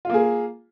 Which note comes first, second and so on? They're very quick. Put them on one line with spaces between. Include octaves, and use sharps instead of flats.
F4 A#3 G#4